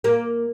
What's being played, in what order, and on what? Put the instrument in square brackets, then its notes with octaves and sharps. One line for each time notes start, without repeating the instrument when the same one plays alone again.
[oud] A#3